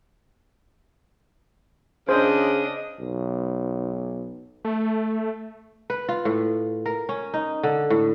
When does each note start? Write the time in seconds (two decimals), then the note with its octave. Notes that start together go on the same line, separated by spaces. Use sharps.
2.09 C#3 D4 C5 D#5
3.00 B1
4.65 A3
5.90 B4
6.09 F4
6.25 A2
6.86 A#4
7.09 C#4
7.34 D#4
7.63 D3
7.90 A2